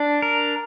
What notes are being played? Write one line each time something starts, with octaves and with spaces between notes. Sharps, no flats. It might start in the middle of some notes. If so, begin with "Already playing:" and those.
Already playing: D4
A#4